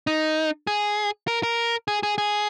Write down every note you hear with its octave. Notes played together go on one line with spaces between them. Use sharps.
D#4
G#4
A#4
A#4
G#4
G#4
G#4